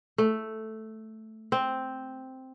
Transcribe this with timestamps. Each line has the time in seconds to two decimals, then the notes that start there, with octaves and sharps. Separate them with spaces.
0.18 A3
1.52 C4